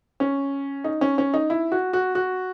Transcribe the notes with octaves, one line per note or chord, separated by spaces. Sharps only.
C#4
D#4
C#4
C#4
D#4
E4
F#4
F#4
F#4